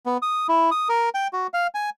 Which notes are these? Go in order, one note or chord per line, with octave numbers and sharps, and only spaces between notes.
B3
D#6
E4
D#6
A#4
G5
F#4
F5
G#5